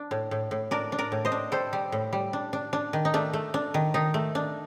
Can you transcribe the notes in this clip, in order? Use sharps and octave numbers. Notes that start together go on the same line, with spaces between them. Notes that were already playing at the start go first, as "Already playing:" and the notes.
Already playing: D4
A2
A2
A2
D4 A#4 D5
D4
A#4 D5
A2
C5 D#5
D4
G3 A4 C5
G3
A2
G3
D4
D4
D4
D#3
D#4
A3 D4
A3
D4
D#3
D#3 D#4
A3
D4